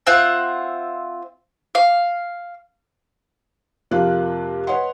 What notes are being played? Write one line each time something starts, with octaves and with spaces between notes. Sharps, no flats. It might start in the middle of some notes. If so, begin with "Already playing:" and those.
C4 F4 E5 F#5
F5
F2 C3 A#3 F4 F#6
B4 C#5 D#5 F#5 C6